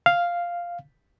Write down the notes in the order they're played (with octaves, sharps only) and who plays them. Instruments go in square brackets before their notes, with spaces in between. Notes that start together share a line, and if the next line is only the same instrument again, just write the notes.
[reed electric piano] F5